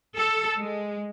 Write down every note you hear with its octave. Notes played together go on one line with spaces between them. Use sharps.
A4
G#3